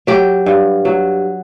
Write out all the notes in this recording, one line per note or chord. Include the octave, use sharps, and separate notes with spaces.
F#3 G4
G2
F#3